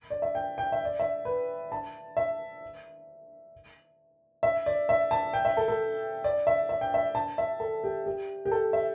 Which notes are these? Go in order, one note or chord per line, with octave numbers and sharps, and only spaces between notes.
D5
E5
G5
G5
E5
D5
E5
B4
A5
E5
E5
D5
E5
A5
G5
E5
A4
A4
D5
E5
E5
G5
E5
A5
E5
A4
G4
G4
G4
A4
E5